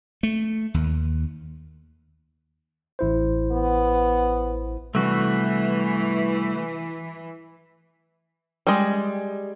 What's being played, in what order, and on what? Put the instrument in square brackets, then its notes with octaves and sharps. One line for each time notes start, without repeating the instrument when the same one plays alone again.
[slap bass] A3
D#2
[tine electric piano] A1 E4 C5
[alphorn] B3
[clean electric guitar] C2 [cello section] E3 [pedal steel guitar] A3 F#4
[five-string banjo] G3 G#3